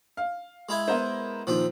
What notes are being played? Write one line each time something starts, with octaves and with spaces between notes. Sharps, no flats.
F5
G#3 E4 G#5
B3 A#4 C5
A#2 D#3 F3 C4